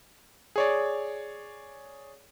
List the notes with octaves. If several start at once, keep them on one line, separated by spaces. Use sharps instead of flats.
G#4 C#5 D5